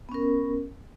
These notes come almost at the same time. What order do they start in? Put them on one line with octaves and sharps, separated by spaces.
B3 C#4 A#4